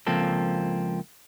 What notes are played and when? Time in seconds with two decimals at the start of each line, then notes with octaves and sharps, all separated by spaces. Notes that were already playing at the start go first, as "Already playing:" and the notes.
0.07 C#2 F3 A#3 C4 A4